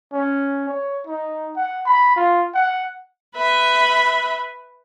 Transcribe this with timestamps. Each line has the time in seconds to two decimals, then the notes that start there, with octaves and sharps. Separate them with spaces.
0.13 C#4
0.69 C#5
1.07 D#4
1.56 F#5
1.86 B5
2.16 F4
2.54 F#5
3.36 B4 E5